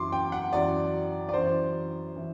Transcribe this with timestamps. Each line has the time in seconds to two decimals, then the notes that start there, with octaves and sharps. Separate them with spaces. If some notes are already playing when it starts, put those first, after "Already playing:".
Already playing: F#2 E3 C6 D6
0.12 G5
0.32 F#5
0.53 F#2 E3 D5
1.29 D5
1.34 F#2 E3 C5
2.16 E3